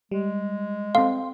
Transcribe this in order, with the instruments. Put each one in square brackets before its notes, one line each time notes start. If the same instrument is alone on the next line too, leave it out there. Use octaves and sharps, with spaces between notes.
[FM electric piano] G3 [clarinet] G#3
[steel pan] C4 A4 [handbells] F5 [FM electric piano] C6